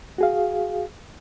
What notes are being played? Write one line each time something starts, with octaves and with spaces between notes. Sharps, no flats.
F#4 G#4 F5